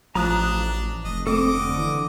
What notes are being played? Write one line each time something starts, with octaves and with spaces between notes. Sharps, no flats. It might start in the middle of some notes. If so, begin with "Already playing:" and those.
A1 F3 D4 A5 A#5 D#6 F#6
F1 D#5
A3 C4 A4 D#5 D6
D3
E3